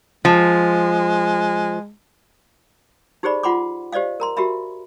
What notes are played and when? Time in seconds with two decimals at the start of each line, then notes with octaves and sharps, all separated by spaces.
0.25 F3 G#3
3.23 D#4 G4 G#4 C5 D5 B5
3.43 F4 F#5 B5 C6 D6
3.92 G4 C5 D5 D#5 F5
4.20 A#4 A#5 C6
4.37 F#4 G4 A#4 E5 B5